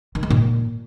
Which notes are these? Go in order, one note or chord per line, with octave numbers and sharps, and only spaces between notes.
D#3
G#3
A#2